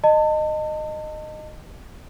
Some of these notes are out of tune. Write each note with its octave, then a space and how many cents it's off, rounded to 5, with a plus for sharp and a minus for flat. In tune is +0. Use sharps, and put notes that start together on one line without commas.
D#5 -15 A5 +35